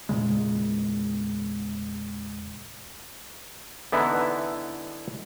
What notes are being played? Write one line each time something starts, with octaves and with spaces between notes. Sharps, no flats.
E2 A#2 C#3 G#3
D3 E3 B3 D#4 E4